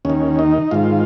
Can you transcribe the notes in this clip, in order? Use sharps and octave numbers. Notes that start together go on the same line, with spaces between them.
D#2 D#3 C#4
D#4
G#2 D#3 F4